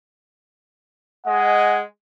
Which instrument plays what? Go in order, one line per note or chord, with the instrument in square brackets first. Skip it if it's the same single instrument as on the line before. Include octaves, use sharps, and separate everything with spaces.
[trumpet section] G#3 D#5 G#5 [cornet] F#5